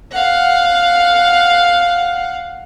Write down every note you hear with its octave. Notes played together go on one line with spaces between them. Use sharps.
F5 F#5